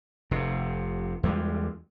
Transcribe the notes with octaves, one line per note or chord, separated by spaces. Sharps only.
F1 C3
E2 G3 G#3